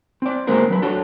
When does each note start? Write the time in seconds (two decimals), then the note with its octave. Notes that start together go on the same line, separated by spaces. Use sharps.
0.22 C4 D5
0.47 D3 G#3 A#3 C4 A#4 C5
0.70 F#3 B4
0.82 D4 F#4 A4 C#5